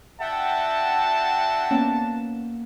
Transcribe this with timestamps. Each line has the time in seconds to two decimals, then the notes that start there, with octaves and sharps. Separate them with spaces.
0.21 D4 F#4 E5 F#5 G5 A5
1.71 A#3 B3 C#4